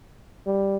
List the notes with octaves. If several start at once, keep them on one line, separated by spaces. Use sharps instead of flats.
G3